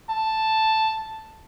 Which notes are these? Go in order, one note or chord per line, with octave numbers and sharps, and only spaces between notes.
A5